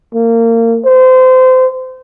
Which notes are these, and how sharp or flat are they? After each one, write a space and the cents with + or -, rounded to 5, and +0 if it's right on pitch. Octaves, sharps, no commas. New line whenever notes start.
A#3 -25
C5 -25